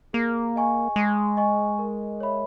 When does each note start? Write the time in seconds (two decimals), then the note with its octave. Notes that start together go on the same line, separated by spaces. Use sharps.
0.13 A#3 G#4
0.56 D#5 G#5 C#6
0.96 G#3 G#4
1.37 D#5 G#5 C#6
1.79 A#4
2.20 C#5 E5 B5